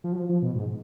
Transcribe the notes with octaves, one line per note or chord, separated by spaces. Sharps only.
F3
F#3
F3
F3
B2
G#2